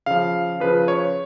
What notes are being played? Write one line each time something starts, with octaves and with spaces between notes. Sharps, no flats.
C#3 F3 F5
C#3 F3 B4
C#5